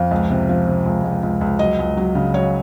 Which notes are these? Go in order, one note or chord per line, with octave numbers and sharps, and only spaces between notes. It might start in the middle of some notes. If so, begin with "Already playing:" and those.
Already playing: F2 F5
C#2
C3
F3
C3
C#2
C#2
C#2
C#2
F#3 D#5
C#2
F#3
C#3
F#3 C#5